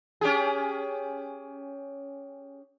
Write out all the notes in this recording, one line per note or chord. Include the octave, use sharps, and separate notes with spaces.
C#4 G4 G#4